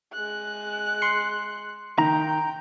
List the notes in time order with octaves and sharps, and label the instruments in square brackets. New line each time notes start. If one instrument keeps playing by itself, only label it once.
[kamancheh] G#3 F#6
[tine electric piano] C6 C7 C#7
[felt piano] D#3 [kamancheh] G5 [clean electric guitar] A#5